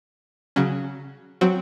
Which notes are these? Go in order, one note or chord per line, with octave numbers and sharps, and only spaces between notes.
C#3 F#3 C#4
F#3 C4 F#4